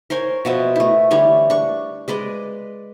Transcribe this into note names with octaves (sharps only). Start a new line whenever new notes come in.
A#4 C5 C#5 G#5
B2 F3 E5
A3 E4
D3 E3 G3 C#5
D4 C#6
G#3 B4 D5 D#5